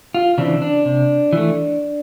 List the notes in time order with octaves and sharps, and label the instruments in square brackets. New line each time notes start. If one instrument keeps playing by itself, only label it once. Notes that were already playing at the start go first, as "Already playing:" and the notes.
[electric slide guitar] F4
C#3 E3 C4 D4
D4
C3
E3 A3